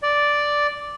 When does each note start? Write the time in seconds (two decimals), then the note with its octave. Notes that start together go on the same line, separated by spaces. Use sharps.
0.03 D5